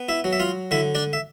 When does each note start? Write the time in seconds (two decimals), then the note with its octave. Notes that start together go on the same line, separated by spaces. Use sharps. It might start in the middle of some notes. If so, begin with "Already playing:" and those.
Already playing: B3
0.09 E4 E5
0.24 F#3
0.33 E5
0.39 F4 F5
0.71 D3 E4 E5
0.95 D4 D5
1.13 E5